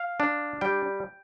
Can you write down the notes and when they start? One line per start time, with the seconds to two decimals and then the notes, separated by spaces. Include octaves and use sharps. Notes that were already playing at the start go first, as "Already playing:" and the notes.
Already playing: F5
0.20 D4
0.61 G3 G5